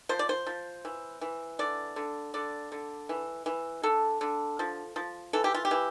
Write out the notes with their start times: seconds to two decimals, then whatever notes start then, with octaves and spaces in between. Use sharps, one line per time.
0.09 F3 C5
0.19 D5
0.29 C5
0.47 F3
0.85 E3
1.21 E3
1.59 D3 D5
1.96 D3
2.34 D3 D5
2.72 D3
3.09 E3
3.46 E3
3.83 D3 A4
4.21 D3
4.59 F3
4.96 F3
5.33 E3 A4
5.44 G4
5.54 F4
5.65 G4
5.71 E3